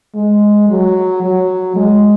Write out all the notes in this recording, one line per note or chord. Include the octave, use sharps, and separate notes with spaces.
G#3
F#3
F#3
G#3